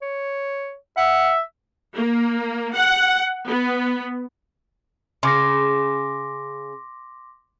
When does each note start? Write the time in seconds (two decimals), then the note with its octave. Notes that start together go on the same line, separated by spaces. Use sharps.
0.02 C#5
0.97 E5 F#5
1.95 A#3
2.75 F#5
3.48 B3
5.23 C#3 C6 D6 A#6